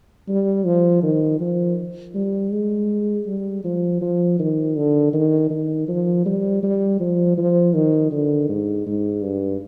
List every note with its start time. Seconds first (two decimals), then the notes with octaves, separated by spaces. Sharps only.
0.29 G3
0.66 F3
1.03 D#3
1.40 F3
2.15 G3
2.52 G#3
3.26 G3
3.64 F3
4.01 F3
4.39 D#3
4.76 D3
5.13 D#3
5.50 D#3
5.88 F3
6.25 G3
6.63 G3
7.00 F3
7.37 F3
7.74 D#3
8.11 D3
8.49 G#2
8.86 G#2
9.23 G2